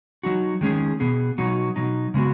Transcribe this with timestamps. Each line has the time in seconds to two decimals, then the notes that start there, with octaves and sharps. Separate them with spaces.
0.23 F#3 D#4 F#4
0.61 D#3 G#3 C#4 G#4
1.00 B2 B3 G#4
1.38 B2 F#3 D#4 F#4
1.76 B2 F#3 D#4
2.14 C#3 G#3 B3 F#4